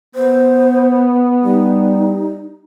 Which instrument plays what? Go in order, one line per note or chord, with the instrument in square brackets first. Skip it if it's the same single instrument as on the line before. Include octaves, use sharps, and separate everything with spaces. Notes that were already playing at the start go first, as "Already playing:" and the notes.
[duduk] B3 [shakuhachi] C5
[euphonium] G3 [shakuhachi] D#4